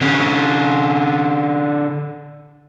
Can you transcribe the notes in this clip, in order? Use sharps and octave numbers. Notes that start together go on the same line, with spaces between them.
D3 C#4